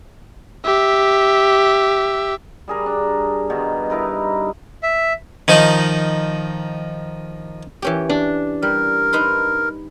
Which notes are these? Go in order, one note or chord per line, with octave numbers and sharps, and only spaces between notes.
G4 E5
G3 G#4 A#4
D4
G2 B2 D#3
D#4 E4 A#4 B4
E5
D#3 F3 D#4
E3 C#4 G4
D4
G3 A#4
D#4 B4 C6